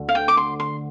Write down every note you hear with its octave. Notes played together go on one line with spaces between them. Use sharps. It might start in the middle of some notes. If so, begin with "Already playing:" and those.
Already playing: D2 D3 A3
F5
G5
D6
C6
C6